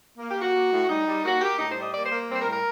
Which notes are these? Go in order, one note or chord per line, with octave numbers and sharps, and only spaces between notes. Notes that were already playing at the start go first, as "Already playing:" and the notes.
A#3
G4
A#3
F#4
A#3
A2
G3 D#4
G3
A#3 F#4
A#3 G4
A2 D#4
C5
G3
D#5
A#3 D5
C5
A#3
G3 C4
C5
A#4
A2
A#4